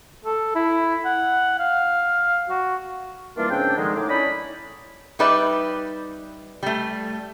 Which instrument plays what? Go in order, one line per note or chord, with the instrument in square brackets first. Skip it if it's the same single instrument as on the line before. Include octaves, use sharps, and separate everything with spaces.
[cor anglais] A4
E4
F#5
F5
F#4
[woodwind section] D#3 E3 G3 A#3 D4 F4
G#2 C#3 C4 D4 G5
D3 D#3 F3 G#3
A2 D#4 D6
C#4 D4 E4 D5 D#5 B5
[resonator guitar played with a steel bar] G3 D#4 B4 D5 E5
G3 A3